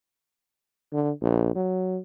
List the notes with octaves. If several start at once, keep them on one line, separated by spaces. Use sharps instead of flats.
D3
A#1
F#3